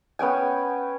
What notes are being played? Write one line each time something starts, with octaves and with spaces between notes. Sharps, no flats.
B3 C#4 G5 G#5